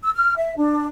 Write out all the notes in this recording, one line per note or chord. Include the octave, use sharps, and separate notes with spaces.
E6
F6
E5
D4